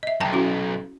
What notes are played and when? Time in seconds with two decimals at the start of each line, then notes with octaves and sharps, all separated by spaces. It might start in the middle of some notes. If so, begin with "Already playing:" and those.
0.03 D#5 E5
0.21 B1 F#2 G5 A5 A#5
0.33 C#4 E4 F#4